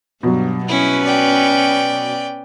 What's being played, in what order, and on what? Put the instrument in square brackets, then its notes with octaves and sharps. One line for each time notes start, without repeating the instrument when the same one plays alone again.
[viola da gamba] G2 [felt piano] B2 F#3
[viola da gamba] B3 C#4 B4 [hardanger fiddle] E4
[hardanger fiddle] D5 G5